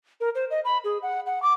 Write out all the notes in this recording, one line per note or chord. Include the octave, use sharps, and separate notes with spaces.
A#4
C5
D#5
B5
G#4
F#5
F#5
D6